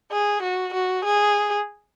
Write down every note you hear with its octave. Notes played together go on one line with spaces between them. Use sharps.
G#4
F#4
F#4
G#4